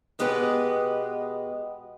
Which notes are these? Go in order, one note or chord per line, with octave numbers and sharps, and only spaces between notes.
B2 G#3 B3 G4 B4 D#5